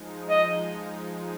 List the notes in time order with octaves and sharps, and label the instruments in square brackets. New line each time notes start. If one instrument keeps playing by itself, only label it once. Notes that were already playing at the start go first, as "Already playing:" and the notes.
Already playing: [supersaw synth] F3 G#3 D#4
[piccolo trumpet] D#5